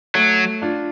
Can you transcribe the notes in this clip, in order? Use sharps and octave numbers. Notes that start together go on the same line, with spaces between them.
F#3 A3
D4 F4